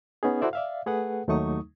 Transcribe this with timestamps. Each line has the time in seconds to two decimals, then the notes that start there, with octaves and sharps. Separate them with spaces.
0.23 B3 C#4 D#4 G#4
0.41 E4 F#4 A4 C5 D5 E5
0.53 D5 E5 F5
0.86 A3 G#4 A4 B4 F#5
1.28 D#2 F#3 A3 D#4 C#6 D#6